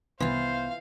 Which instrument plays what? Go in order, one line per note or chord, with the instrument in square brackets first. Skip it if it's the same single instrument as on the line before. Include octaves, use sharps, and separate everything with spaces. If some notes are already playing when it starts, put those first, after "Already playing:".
[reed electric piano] C2 B3 C6 [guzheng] E3 F4 [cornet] C5 [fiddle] F5